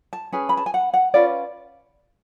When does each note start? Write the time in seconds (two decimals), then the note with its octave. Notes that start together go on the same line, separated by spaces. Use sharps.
0.13 A5
0.32 C#4 G#4 B4 G#5
0.49 B5
0.57 A5
0.66 G#5
0.74 F#5
0.94 F#5
1.14 C#4 F4 B4 D5